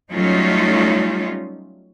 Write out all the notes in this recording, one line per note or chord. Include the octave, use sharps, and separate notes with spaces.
F#3 G3 A3 C#4 D#4 F4